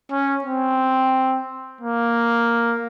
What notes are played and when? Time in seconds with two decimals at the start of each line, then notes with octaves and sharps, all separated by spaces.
0.11 C#4
0.44 C4
1.81 A#3